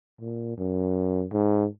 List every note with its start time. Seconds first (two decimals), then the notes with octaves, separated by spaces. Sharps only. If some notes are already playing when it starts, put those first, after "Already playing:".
0.20 A#2
0.58 F#2
1.32 G#2